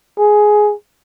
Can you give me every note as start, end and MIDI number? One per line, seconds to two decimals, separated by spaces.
0.19 0.74 68